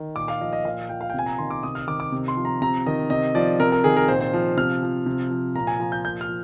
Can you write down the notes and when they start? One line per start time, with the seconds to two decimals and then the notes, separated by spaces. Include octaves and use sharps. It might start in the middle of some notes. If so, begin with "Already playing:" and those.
Already playing: D#3
0.16 A#2 D6
0.28 F5
0.41 F3 D#5
0.53 D#5
0.65 A#2 F5
0.89 F3 G5
1.01 F5
1.10 G5
1.14 C3 G#5
1.26 A#5
1.38 D#3 C6
1.50 D6
1.63 C3 D#6
1.75 F6
1.88 D#3 D6
2.00 D6
2.12 C3
2.28 C6
2.37 F3
2.45 A#5
2.62 C3 A#5
2.86 D#3 D#5
3.10 C3 D#5
3.35 F3 D5
3.60 C3 A#4
3.72 A#4
3.84 D#3 G#4
3.96 A#4
4.08 A#2 C5
4.21 C5
4.34 F3
4.57 C3 F6
4.82 F3
5.06 C3
5.31 F3
5.55 A#2 A#5
5.67 G#5
5.79 F3 A#5
5.92 G6
6.05 A#2 G6
6.21 F6
6.29 F3